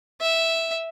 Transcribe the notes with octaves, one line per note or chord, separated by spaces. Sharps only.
E5